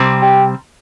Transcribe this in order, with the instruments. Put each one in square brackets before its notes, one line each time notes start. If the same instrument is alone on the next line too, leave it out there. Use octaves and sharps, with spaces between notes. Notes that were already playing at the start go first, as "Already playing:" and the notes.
Already playing: [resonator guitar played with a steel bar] C3 G3 C4
[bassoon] G4